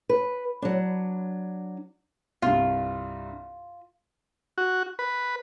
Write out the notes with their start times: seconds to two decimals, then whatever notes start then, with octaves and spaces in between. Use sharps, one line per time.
0.09 B4
0.62 F#3 D4
2.42 C2 G2 F4
4.58 F#4
4.99 B4